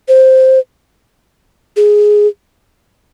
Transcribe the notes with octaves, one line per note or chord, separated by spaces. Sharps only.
C5
G#4